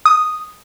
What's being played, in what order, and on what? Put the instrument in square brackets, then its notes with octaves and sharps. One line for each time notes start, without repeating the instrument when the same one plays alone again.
[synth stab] D#6